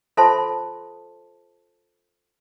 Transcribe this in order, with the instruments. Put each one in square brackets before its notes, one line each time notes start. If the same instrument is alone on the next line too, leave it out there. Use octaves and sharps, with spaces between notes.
[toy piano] F4 A4 C5 E5 A5 C6